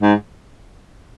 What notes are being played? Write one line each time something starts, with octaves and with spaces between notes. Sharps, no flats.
G#2